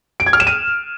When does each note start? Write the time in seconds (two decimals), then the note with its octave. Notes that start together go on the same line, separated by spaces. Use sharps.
0.20 D7
0.26 G#6
0.33 F6
0.40 E7
0.47 D#7